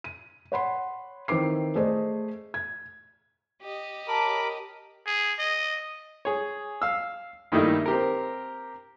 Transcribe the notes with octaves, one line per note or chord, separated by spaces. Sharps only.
D#7
C#5 F#5 B5 C6
D#3 C4 E4 B4 D6 C7
A3 G#4 C5 D5 D#5
G#6
G4 D#5
A#4 C#5 A5 B5 D6
G#4
D#5
G#4 C#5
F5 E6
G2 D#3 A3 A#3 D#4 E4
C4 G4 A#4